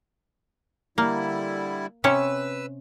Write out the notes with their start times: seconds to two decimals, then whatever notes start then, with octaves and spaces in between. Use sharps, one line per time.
0.98 D3 G3 A#3 E4
2.04 C3 C#4 B4 C#5 E6